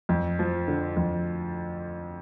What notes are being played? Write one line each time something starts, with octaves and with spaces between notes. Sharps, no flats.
F2
F3
D3
F2